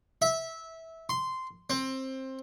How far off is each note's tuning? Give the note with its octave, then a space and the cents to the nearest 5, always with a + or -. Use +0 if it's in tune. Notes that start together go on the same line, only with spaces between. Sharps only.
E5 -15
C6 -10
C4 +15